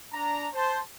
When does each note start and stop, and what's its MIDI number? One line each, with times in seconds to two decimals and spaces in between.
0.13 0.48 62
0.13 0.48 82
0.54 0.80 72
0.54 0.80 81